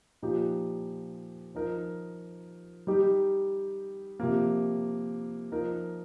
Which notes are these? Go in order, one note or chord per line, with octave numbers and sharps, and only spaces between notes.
A#2 F3 D#4 G4
F3 D#4 A#4
G3 D#4 G4
C3 F3 A#3
F3 D#4 A#4